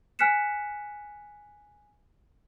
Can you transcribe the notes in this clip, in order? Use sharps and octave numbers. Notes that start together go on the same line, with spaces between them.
G#5 F6 F#6 B6 C#7 E7